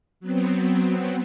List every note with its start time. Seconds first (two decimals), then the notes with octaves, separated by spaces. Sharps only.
0.20 F#3 B3 C4